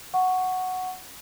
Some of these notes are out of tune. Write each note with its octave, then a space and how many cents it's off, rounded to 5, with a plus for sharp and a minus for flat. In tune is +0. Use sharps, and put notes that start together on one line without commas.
F#5 +0 C#6 +0